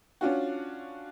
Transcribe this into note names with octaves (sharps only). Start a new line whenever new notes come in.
C#4 D4 F4 F#4